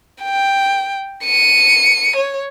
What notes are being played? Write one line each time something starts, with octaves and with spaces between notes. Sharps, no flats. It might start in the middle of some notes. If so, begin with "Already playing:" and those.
G5
C#7 D#7
C#5